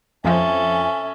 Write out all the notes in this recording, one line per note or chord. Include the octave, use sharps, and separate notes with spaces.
F2 F3 C#4 A4 E5 G#5